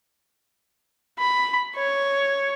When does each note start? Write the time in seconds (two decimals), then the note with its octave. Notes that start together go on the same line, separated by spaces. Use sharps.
1.19 B5
1.75 C#5